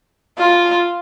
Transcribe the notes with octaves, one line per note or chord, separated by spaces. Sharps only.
F4